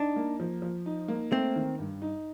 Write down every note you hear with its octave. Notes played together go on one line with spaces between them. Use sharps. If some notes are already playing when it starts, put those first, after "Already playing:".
Already playing: D4 D#4
A#3
F3
F3
D#4
A#3
A3 C4
D#3
G2
D#4